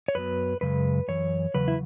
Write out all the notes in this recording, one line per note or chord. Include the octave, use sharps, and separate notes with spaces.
C#5
F#2 F#3 B3 B4
F#2 C#3 G#3 B4
F#2 E3 C#5
E2 C#3 F#3 B4
E4